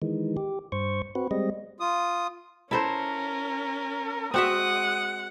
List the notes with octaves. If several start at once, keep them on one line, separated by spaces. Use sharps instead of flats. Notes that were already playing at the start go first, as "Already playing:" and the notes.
D#3 E3 G#3
G4
G2 C5 C#6
C4 F#4 B4
G3 G#3 C4 D#5
F4 D#6
C#4 E4 A4 A#4 C5
G#3 C4 F#4 E5 F#5 D#6